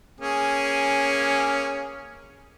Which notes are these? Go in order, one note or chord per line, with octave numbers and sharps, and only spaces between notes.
A#3 C#4 G#4